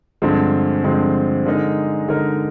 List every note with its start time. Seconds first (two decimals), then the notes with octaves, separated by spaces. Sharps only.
0.22 G2 D3 F3 G#3 C4
0.84 G2 D3 F3 G#3 C4
1.46 D3 G#3 D#4 A#4 D#5
2.08 D3 G#3 D#4 A#4 D#5